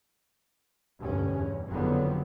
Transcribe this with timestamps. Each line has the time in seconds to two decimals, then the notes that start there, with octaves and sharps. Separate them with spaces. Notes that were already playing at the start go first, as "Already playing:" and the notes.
0.99 F1 D2 G2 B2 C#4
1.36 E2
1.68 F#1 F2 D3 F#3 G3 B3